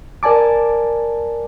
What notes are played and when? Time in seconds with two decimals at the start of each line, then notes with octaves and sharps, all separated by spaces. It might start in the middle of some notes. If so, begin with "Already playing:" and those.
0.23 A#4 D5 G#5 A5 D6